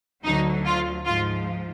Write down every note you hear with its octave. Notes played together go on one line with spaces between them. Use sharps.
D2 D3 F#3 D#4
F4
G#2 F3 F4